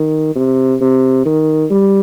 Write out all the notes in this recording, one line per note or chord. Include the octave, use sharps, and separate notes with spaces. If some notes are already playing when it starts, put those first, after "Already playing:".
Already playing: D#3
C3
C3
D#3
G3